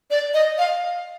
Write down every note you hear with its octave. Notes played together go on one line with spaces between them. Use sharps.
D5
D#5
F5